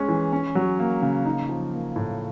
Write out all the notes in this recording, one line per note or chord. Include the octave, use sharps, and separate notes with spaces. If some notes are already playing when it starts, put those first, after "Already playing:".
Already playing: G#3 C#4
E3
C#4
F#3
A#3
C#3
D#4
F3
A#3
A2